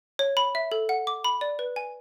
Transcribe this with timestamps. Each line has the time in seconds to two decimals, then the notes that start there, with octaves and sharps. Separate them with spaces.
0.19 C#5
0.37 B5
0.55 E5
0.72 A4
0.89 F#5
1.07 D6
1.24 B5
1.41 D5
1.59 B4
1.76 G#5